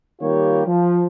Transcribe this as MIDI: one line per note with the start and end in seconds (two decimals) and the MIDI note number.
0.21 0.62 51
0.21 0.62 55
0.21 0.62 58
0.21 0.62 65
0.21 0.62 67
0.21 0.62 73
0.66 1.07 53